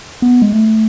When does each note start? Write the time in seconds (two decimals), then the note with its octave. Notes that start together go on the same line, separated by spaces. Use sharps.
0.22 B3
0.42 G#3
0.52 A3